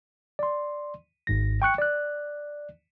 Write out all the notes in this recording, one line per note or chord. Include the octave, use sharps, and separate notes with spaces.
D5 C6
G#1 G#2 A#6
G5 C#6 F#6 C#7
D5 F#6